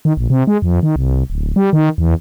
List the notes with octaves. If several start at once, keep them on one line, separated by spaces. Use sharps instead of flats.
D#3
A#1
C3
G#3
F2
D#3
C2
D1
G3
D#3
E2